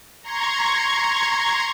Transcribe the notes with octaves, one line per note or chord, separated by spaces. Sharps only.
A#5 C6 C#6 G#6